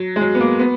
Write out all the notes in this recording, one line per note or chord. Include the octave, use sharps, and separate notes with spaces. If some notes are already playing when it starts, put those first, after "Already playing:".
Already playing: F#3
G#3
F#3
B3
A#3
B3